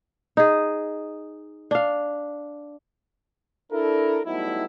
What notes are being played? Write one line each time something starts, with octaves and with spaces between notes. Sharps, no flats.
D#4 G#4
D4 F5
D4 E4 A4 A#4
F#3 G3 A3 B3 D#4 E4